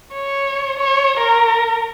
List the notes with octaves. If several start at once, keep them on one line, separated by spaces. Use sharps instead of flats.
C#5
C#5
A#4